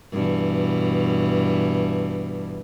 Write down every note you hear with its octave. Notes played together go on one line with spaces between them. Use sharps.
G2 B2 E3